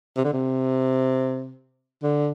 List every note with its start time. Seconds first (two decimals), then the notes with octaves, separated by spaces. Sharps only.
0.17 C3
0.24 D3
0.32 C3
2.03 D3